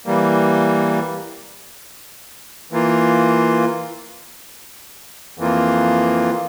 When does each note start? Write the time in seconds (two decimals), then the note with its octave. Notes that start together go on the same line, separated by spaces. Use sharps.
0.06 E3 G3 A#3
2.72 E3 A#3 F4
5.38 F2 E3 A#3 F4